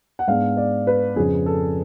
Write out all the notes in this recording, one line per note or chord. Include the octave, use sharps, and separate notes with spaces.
F#5
G#2 G#3 B3 D4 F5
D5
B4
F2 C#3 F3 G#4
A4